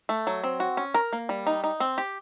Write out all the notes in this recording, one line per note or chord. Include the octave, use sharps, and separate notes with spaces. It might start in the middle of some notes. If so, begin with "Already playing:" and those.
A3
F#3
C4
F#4
C#4
A#4
A#3
G3
D#4
D#4
C4
G4